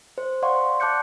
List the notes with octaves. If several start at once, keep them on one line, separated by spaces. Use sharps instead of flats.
C5
D5 F5 F#5 C6 C#6
D5 A5 D6 F#6 G6 C#7